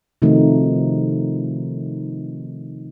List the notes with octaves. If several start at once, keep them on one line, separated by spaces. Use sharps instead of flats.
C3 D#3 F3 A3 D#4 F#4